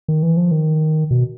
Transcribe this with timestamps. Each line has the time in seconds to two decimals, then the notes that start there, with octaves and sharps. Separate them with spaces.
0.08 D#3
0.23 E3
0.37 F3
0.51 D#3
1.11 B2